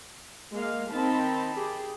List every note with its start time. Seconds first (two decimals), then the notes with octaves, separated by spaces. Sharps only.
0.53 G#3 A#3 F5
0.92 D#3 C4 D#4 A5 B5
1.58 G4 G#4